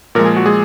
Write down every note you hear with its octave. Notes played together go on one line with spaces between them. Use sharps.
A#2 F3 G#3 A#4
G#4
F#4
G#3 G#4